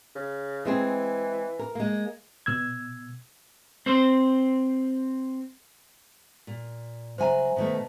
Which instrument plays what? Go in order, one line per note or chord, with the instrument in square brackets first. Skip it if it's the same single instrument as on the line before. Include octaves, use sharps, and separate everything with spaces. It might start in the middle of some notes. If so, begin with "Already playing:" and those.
[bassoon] C#3
[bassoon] E3 [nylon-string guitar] G#3 C4 G#4
[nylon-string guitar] A#4
G#3 A#3
[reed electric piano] B2 E6 G#6
[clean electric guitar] C4 C5
[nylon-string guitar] A#2
[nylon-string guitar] C#3 F#3 G#5 [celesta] C5 E5 A#5
[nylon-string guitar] B2 D#3 A3